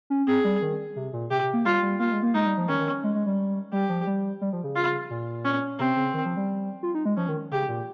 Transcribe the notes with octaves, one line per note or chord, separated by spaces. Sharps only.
C#4
C4 G#4
G3
D#3
C3
A#2
C3 G4
C3
A#3
G3 F4
G3
A#3 F4
G#3
A#3
G#3 D#4
G3
F3
D#3 C#4
D#3
G#3
G#3
G3
G3 G4
F3
G3
G3
F3
C#3
F4
A#2
C#4
C3 C4
C#3
D#3
F3
G3
F4
D#4
G#3
F3 C#4
D#3
C#3 G4
A#2